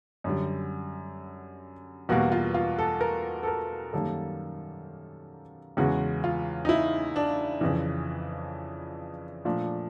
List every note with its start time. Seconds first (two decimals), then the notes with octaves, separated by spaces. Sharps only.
0.24 F#2 D3 G3
2.09 E2 B2 G3 A#3 F#4
2.32 F4
2.54 F4
2.78 A4
3.01 A#4
3.43 A4
3.48 A#4
3.93 F#2 D#3 G3 A#3 A4
5.77 E2 C#3 E3 G#3 F#4
6.24 F4
6.65 D#4
6.69 E4
7.16 D4
7.61 F2 C#3 E3
9.45 A#2 F3 A3 D4